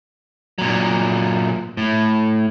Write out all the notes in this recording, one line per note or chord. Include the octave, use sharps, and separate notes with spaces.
A#2 F#3
A2